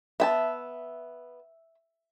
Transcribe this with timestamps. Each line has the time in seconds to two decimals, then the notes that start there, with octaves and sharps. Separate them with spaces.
0.20 B3 E5 G5 A5